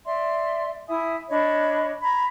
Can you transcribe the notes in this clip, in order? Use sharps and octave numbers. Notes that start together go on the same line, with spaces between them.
D5 E5 C6
E4 E5 G#5 D#6
D4 C#5 D#5 B5
A#5 B5 G#6